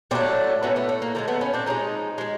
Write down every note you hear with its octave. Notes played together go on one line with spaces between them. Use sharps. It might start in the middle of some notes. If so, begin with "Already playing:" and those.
A2 F#3 A3 C4 D4
A2 F#3 A3 B3 C#4
A3 B3
A3
A#3
D3 F3 G#3 A#3
A3 B3
B3 C#4
C4 D4
D3 F3 G#3 C#4 D#4
F3 G#3